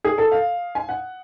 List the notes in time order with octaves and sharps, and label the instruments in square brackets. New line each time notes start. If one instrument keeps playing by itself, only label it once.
[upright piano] G#4
A4
F5
G#5
F#5